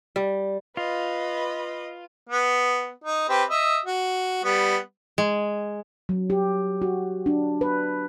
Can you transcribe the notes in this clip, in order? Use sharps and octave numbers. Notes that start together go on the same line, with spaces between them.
G3
F4 B4 D#5
B3
D#4
C4 G4 B4
D#5 E5
F#4
G3 B3
G#3
F#3
G4
F#4
D4
B4